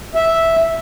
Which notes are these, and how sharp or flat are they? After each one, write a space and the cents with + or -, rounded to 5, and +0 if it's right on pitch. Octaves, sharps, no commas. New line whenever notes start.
E5 -5